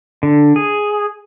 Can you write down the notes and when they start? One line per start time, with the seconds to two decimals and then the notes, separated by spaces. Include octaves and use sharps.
0.23 D3
0.56 G#4